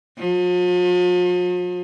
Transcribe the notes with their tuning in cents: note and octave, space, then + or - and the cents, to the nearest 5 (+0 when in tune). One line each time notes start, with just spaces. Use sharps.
F3 +45